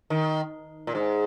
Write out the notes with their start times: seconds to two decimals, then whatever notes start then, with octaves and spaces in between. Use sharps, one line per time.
0.10 D#3
0.87 A#2
0.95 G#2